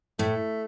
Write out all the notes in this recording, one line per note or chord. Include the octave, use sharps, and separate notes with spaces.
A2 A3